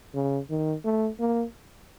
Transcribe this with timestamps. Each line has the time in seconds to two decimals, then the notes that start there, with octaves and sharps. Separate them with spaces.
0.14 C#3
0.50 D#3
0.85 A3
1.20 A#3